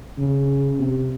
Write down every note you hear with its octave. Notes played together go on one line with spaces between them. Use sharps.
C#3
C3